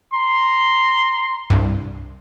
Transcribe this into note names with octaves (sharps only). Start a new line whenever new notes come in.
A#5 C6
C2 G2